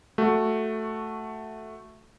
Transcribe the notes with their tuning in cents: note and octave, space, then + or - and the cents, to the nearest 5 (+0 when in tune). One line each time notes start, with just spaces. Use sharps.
A3 +0 F#4 +0